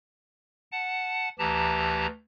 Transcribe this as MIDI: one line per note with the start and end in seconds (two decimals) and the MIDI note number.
0.72 1.29 78
0.72 1.29 81
1.39 2.06 38
1.39 2.06 52
1.39 2.06 67
1.39 2.06 81
1.39 2.06 82